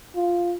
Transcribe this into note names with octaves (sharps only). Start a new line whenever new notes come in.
F4